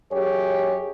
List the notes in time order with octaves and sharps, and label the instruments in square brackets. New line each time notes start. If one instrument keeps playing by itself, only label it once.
[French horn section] F#2 G4 G#4 C#5